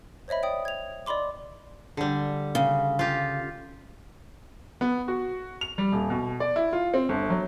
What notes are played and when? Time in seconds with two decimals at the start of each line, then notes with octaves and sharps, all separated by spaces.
0.28 C5 C#5 D#5 E5 B5
0.43 D5 G5 D#6
0.65 G#6 F7
1.06 D5 D#5 B5 C6 D6
1.97 D3 G3
2.55 C#3
2.99 F4 G4
4.81 B3
5.08 F#4
5.61 F7
5.78 G3
5.92 D#1
6.10 B2
6.40 D5
6.56 E4
6.73 F4
6.94 C4
7.09 G1
7.30 F#3